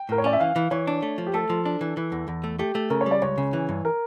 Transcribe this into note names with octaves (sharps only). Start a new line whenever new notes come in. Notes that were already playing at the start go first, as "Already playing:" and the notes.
Already playing: G5
A2 A#4
C#5
C#4 D5
E5
E3 F5
E3
E3 C#5
D4
A3
F3
G4
A3 A4
F3
D4
E3
E3
E2
E2
A3
A3 G4
A3
C#3 A#4
C#5
G3
D5
C#2 C#5
C#3
E3
G2
A#4